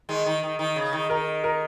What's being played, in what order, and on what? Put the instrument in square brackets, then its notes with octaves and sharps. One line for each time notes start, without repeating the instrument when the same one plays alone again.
[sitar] D#3 G#3
D#3
D#3
D#3
C#3
D#3
[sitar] D#3 [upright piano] A#4
[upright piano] A#4